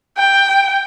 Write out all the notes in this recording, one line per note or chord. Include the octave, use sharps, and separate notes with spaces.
G5